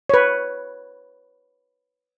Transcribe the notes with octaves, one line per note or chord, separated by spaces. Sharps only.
B4 C#5